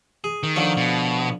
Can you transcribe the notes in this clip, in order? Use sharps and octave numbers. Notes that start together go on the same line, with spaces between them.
G#4
D#3
D3 F3 C#5
B2